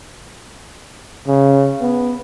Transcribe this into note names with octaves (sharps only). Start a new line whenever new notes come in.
C#3
B3